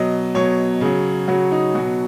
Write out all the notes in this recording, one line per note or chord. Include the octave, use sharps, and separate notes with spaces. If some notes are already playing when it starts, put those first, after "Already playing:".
Already playing: B2 F#3 D#5
B2 F#3 C#5
C#3 F#3
C#3 F#3 F#4
D#4
B2 F#3 F#4